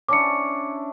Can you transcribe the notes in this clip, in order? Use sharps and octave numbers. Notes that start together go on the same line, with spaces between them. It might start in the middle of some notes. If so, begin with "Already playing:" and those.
C#4 D4 E4 D6 C#7